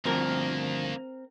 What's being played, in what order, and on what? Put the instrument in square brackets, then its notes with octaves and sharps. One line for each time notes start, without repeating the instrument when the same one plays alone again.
[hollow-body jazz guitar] D2 G2 F3 [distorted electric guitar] D#3 A#3 [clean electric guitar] C4 A#4